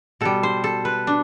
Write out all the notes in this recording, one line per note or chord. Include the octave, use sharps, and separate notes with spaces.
B2 G3 A4
C5
A4
B4
D4